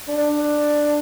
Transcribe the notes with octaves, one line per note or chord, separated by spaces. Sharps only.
D4